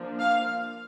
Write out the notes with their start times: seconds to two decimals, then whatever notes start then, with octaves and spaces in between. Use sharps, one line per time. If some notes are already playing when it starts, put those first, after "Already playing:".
Already playing: F3 A#3 D4
0.19 F5